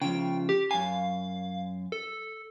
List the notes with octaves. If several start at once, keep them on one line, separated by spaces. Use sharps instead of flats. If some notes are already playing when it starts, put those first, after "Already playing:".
C#3 F3 G5
G4
F#2 F5 G#5
A4